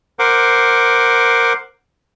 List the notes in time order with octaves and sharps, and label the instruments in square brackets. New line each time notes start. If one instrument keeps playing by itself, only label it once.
[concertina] A#4 C5 F#5 D6